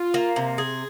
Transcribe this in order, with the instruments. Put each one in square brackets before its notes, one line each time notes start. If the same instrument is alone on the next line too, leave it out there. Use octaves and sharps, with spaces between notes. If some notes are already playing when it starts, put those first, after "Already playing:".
Already playing: [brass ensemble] F4
[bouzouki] A#3
C3
G#4